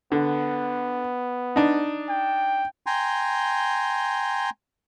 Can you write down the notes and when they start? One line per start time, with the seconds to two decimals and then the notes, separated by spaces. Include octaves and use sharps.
0.12 D3 B3
1.56 D4 D#4
2.09 G5
2.86 G5 G#5 A#5 C6